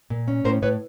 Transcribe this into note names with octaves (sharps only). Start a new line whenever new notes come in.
A#2
C#4
A2 A#4 C5
A2 B4 C#5